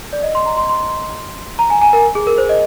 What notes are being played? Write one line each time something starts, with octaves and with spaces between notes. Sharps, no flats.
D5
D#5
C6
A#5
C6
C6
A#5
G#5
G#5
A#4
G#4
A#4
C5
D#5